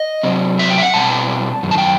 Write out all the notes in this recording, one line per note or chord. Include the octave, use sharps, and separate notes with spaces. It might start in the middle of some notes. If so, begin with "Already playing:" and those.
Already playing: D#5
C3 F#3 C4
E5
G5
E5
F#5
B2 G3 C4 A5
F#2 D#3
A5
G5